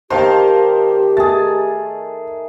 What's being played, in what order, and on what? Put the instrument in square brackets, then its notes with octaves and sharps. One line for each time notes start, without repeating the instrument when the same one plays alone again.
[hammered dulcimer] D#3 [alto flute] G4 [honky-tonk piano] C5 F5 A5
[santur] A3 G#4 [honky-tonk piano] A6